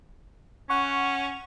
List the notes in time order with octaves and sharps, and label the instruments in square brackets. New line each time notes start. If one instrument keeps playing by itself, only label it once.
[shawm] C#4 [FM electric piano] F#5 C#6